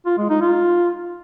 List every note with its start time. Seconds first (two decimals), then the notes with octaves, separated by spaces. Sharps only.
0.06 F4
0.18 G#3
0.29 D#4
0.41 F4